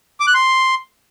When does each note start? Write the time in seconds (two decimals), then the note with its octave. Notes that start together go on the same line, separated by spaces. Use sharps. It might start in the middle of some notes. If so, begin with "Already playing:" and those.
0.20 D6
0.27 F#6
0.34 C6